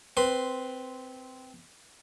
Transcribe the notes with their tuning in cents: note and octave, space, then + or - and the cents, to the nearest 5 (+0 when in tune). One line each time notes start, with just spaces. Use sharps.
C4 -10 B4 +0 C6 -5